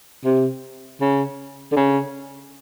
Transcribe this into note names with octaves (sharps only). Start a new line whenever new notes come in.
C3
C#3
D3
C#3